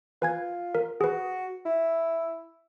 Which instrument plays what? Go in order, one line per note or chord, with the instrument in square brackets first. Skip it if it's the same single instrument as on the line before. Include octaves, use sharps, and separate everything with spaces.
[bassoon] F4 [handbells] B4 G#5 G#6
[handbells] A#4
[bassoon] F#4 [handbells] G#4 B4
[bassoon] E4